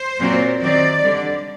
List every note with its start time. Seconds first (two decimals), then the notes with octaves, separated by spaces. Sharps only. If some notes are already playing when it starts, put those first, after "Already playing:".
Already playing: C5
0.19 A#2 F#3 C4
0.60 D#3 F#3 C4 D5
1.02 D3 G3 D4